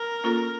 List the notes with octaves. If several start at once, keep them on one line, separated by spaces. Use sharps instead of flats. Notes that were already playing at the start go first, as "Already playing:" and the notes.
Already playing: A#4
A#3 C#4 F4 A4